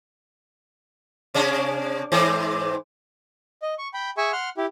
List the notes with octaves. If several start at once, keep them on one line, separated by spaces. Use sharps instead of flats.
C3 C#4 D4
G#2 E3 C4
D#5
C#6
G5 B5
G#4 E5 G#5 C#6
F#5 C6 F6
E4 G4